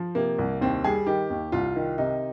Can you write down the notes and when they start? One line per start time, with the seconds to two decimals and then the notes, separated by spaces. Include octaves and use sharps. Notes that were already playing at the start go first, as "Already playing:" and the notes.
Already playing: F3
0.15 C3 A#3
0.38 C2
0.61 D#2 C4
0.84 G3 G#4
1.07 D#3 G4
1.30 D#2
1.52 C2 F4
1.76 D#3
1.98 C3 D#4